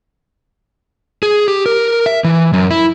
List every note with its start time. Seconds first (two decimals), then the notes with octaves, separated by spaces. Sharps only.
1.23 G#4
1.48 G4
1.66 A#4
2.06 E5
2.24 E3
2.53 F#2
2.71 E4